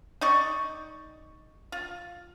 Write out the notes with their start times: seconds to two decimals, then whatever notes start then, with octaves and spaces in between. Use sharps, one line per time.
0.21 D#4 D5 C#6
1.72 F4